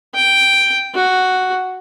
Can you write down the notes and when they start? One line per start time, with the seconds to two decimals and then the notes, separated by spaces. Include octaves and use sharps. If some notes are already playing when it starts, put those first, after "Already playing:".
0.15 G5
0.95 F#4